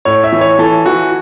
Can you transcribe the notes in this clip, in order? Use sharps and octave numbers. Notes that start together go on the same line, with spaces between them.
A2 C#5
E5
E3
C#5
E3 A4
E3 F#4